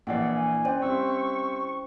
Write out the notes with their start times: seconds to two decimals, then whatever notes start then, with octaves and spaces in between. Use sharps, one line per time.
0.07 A#1 E3 A#3 D5 F#5 C7
0.35 G#5
0.65 C#4 C5 D5 G5
0.81 G3 C4 E4 C#6